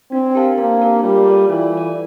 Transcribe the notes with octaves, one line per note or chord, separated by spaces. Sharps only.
C4 D4
G4 A#4 F5 A5
A#3 D4
G4 A#4 F5 A5
G3 F4
A4 D5
E3 F4
A4
D5